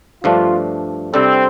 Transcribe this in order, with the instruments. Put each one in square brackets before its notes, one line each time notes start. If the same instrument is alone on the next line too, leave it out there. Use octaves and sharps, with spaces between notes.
[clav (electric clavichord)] G2 F3 A3 D4 [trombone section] F4
[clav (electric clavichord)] C3 G3 D4 A4 [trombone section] C4